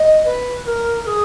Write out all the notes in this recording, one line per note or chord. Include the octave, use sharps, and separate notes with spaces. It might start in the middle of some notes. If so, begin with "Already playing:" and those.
Already playing: D#5
B4
B4
A#4
A#4
G#4